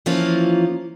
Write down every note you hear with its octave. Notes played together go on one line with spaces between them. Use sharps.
E3 F3 A#3 C#4 F4